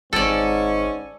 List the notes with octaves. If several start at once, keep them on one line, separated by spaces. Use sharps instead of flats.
G#1 G#2 C#4 A4 D5